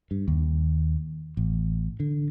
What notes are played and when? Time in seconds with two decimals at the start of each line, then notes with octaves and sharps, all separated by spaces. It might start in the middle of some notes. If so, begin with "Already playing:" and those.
0.11 G2
0.28 D#2
1.37 A1
2.00 D3